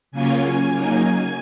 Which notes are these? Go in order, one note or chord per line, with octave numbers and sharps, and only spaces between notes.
C#3 F#3 A#3 C#4 F4 G#5
C#3 F#3 A#3 D#4 G#5
G#5